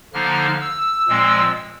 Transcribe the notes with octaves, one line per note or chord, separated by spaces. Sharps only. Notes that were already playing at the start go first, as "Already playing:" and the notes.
D3 F3 A#3 D#4 F6
E6
A#2 F3 G#3 C4